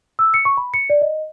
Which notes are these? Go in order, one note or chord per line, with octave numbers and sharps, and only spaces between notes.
E6
C#7
C#6
B5
C#7
D5
D#5